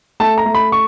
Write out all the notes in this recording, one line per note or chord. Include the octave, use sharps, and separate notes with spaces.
A3 A5
A#5
A3
B5
C#6